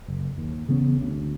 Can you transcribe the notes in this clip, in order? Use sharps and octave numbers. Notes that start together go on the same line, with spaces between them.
F#1
D#2
C#3 E3 B3 C#4
D2